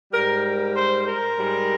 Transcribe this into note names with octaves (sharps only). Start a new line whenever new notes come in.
G#2 G3 A#4
A#4
C5
A#4
G#2 G3